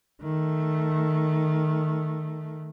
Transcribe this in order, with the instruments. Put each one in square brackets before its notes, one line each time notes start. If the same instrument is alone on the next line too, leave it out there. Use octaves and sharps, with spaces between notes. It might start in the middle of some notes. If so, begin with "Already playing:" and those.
[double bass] D#3 A3